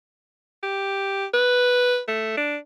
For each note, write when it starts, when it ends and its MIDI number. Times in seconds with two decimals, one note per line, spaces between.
0.63 1.26 67
1.34 2.00 71
2.08 2.36 57
2.37 2.57 62